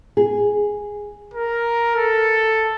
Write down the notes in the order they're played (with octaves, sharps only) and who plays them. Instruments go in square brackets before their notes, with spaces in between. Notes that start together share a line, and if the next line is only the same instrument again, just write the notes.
[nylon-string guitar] G#4
[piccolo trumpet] A#4
A4